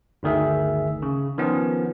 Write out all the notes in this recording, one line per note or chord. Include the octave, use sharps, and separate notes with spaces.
G1 D2 D#3 G#4 E5
C#3
D#3 F3 B3 C#4